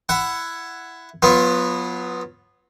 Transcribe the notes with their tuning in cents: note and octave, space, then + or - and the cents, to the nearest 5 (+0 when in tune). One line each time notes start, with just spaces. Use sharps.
E4 +15 F#5 +0
F#3 -30 B3 +0 F4 +0